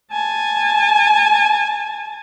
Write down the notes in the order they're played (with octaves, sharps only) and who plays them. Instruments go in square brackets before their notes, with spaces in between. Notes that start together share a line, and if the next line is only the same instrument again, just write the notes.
[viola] G#5 A5